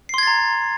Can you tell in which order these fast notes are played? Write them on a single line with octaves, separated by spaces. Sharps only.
C7 C6 G#6 A6 A#5